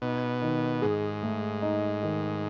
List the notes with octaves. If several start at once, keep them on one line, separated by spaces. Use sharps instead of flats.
B2 D#4
D#3
G#2 G#4
A3
D#4
D#3